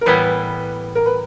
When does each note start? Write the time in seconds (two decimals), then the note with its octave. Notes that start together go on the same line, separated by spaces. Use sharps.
0.01 A#4
0.06 A2 E3 G3 B3 E4 B4
0.95 A#4
1.06 B4